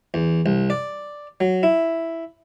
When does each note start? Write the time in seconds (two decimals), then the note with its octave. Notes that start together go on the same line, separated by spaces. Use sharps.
0.14 E2
0.46 C2
0.70 D5
1.40 F#3
1.63 E4